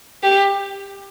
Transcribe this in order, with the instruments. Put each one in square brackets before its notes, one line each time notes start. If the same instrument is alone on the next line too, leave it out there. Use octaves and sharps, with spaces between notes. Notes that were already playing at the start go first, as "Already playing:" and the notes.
[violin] G4